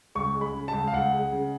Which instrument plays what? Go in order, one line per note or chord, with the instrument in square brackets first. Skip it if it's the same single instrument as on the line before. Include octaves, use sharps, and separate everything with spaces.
[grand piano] C#2 C#6
G#3
B5
C#3
A5
C#2
F5
C#2 F#5
G#3
C#3